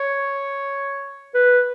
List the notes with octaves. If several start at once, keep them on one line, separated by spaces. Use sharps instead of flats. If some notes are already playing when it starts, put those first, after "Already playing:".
Already playing: C#5
B4